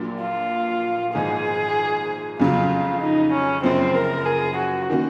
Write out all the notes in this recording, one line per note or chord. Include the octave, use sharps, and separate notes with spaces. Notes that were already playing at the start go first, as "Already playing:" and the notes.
Already playing: A#1 A#2 F#3
F4
G#1 G#2 F3 G#3 G#4
F2 C#3 F#3 F4
D#4
C#4
F#1 F#2 F3 C4
A#4
G#4
F#4
D#3 A#3 C#4 F#4